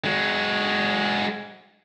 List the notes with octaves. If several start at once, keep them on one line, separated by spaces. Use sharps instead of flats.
G#3 F#4